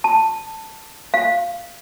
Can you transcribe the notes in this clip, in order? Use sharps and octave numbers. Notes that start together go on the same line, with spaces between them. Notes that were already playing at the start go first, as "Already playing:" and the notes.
A5
F5